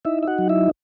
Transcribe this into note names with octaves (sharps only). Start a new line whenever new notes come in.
D#4 E4 E5
E5
F#4 F#5
F#3
E4 E5